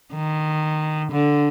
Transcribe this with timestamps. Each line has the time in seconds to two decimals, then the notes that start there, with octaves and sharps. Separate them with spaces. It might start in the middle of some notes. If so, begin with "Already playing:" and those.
0.14 D#3
1.12 D3